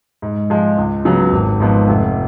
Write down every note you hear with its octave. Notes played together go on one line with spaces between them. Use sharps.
G#2
F3 G#3
C#2
C#3 F#3 B3
G#1
G#2 F3 B3
F1